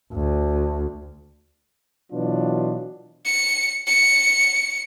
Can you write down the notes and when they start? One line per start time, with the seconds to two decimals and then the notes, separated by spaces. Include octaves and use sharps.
0.13 D2
2.12 B2 E3 F#3 D4 F4
3.26 C#7
3.87 C#7